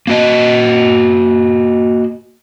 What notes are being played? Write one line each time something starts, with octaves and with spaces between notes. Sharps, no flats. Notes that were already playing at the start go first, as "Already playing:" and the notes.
A#3 F#4 D#5